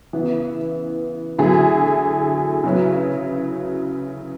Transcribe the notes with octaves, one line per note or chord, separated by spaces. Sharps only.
C#3 E3 B3 E4
D3 F#3 A3 E4 G#4
C#3 F#3 C#4 E4 B4